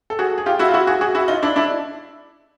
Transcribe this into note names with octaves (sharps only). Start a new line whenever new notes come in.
A4
F#4 G#4
G#4
F4 G4
E4 F#4
F4
E4 F#4
F#4 G#4
F#4 G#4
E4 F#4
D#4 F4
D4 E4
D4 E4